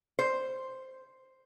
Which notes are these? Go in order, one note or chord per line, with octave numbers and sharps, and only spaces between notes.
C5